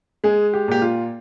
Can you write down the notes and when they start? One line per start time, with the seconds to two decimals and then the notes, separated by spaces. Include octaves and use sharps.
0.24 G#3 G#4
0.54 G4
0.68 A#2 G4
0.82 F4